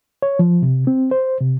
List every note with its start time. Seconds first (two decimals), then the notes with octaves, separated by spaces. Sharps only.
0.22 C#5
0.39 F3
0.62 C3
0.87 C4
1.11 C5
1.40 C3